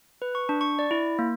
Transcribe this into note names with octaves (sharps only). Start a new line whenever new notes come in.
B4
C#6
D4
C#6
D5
E4
A#3